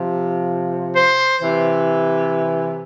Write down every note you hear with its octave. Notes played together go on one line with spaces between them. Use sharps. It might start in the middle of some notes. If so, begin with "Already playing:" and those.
Already playing: C3 F3
C5
C3 E3